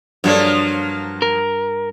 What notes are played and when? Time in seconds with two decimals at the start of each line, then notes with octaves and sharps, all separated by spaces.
0.24 G2 F3 F#3 A#3 C#5
1.22 A#4